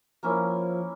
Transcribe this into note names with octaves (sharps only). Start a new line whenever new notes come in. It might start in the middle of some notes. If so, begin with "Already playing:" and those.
F3 A#3 C#4 E4